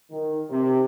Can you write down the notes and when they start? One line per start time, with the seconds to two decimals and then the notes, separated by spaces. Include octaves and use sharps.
0.12 D#3
0.51 C3